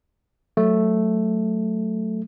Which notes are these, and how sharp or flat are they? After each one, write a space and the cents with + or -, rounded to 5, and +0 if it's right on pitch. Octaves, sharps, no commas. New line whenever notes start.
F#3 +0 A3 +0